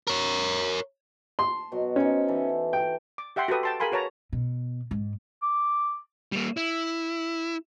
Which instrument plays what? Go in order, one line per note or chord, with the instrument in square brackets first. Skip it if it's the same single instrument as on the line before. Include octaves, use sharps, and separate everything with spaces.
[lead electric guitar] A#4 C#5
[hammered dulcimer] A5 [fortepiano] C6
[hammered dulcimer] B2 F#3
[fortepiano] C#4 [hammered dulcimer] D#4 C5
[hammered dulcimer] E3 A4
[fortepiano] G5
[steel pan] D6
G4 E5 F#5 G5 C6
F#4 G4 A4 B4 D#6
G5 A5 C6
G#4 A#4 F5 G#5 B5 C6
F#4 B4 C#5 A5 A#5
[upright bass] B2
G#2
[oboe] D6
[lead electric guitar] G3 A#3
E4